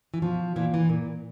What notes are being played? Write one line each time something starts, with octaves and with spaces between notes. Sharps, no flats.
E3
B2 F3
A#2 E3
E3
A#2